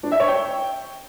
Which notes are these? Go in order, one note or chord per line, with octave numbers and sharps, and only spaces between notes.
D4
E5
C#5
G5